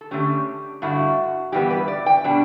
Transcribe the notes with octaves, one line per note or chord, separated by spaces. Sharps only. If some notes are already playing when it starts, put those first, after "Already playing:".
A4
D3 A3 C#4 G4
G2 D3 A3 E4 F#4
G2 E3 G3 B3 G4
B4
D5
G5
B2 G3 D4